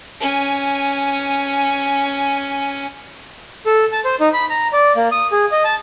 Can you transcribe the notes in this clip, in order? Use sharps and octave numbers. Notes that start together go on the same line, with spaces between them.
C#4 G#5
A4
A5
C5
D#4
B5
A#5
D5
A#3
D#6
G#4
D#5
A5